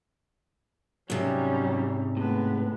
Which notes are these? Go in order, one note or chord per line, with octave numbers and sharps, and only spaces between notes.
G#2 C3 F#3 G3 C#4
A2 G#3 B3